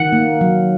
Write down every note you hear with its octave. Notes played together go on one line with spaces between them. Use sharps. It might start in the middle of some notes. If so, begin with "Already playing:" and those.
Already playing: D#3 F#5
A#3
F#3